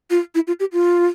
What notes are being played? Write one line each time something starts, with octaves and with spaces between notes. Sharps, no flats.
F4
E4
F4
G4
F4